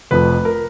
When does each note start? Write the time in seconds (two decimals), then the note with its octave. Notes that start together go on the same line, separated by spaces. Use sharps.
0.11 F1 F2 F3 B4
0.45 A#4